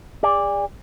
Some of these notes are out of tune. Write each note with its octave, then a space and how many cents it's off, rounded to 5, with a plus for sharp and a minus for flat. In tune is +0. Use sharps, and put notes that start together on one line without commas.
G#4 -40 D5 +0